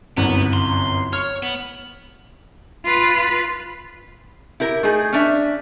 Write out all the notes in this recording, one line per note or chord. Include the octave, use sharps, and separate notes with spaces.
G1 C2 F#2 B3
C6
C#5 F6
B3
F4 B4
E4 G4 A#4
A3 D#4 G#4
C#4 D4 E5